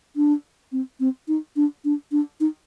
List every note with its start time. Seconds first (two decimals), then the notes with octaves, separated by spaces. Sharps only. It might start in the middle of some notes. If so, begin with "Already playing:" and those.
0.16 D4
0.72 C4
1.00 C4
1.28 D#4
1.56 D4
1.84 D4
2.12 D4
2.40 D#4